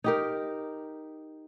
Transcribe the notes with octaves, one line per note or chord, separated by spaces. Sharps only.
D#4 G4 A#4